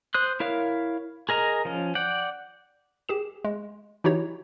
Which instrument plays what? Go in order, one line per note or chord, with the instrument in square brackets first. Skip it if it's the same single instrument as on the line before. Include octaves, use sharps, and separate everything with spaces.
[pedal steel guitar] C5 D#6 F#6
E4 A#4 C#5 F5
G#4 A#4 D#5 A#5
F3 C#4
D5 F#5 G5
[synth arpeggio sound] G4 G#4 E7
G#3
E3 D#4 E4 F#4 G4 C#5